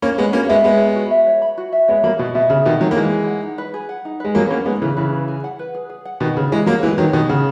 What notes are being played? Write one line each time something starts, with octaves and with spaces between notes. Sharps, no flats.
A#3 C#4 C#5
G#3 B3 B5
A#3 C#4 F#4
G#3 B3 E5
G#3 B3 C#5
B5
F#4
E5
C#5
B5
F#4
E5
G#3 B3 C#5
F#3 A#3 B5
B2 F#4
B2 E5
C#3 G#4
B2 D#3 F#5
D#3 F#3 D#4
A#3
E3 G#3 B4
G#4
F#5
D#4
B4
G#4
F#5
D#4
G#3 B4
F#3 A#3 G#4
B3
A#3 C#4 F#5
G#3 B3 D#4
C#3 E3 B4
C#3 E3 B4
G#4
G#4
F#5
B4
G#4
G#4
F#5
B2 D#3 B4
C#3 G#4
E3 G#3 G#4
F#3 A#3 F#5
E3 G#3 B4
D#3 F#3 G#4
B2 D#3 G#4
C#3 F#5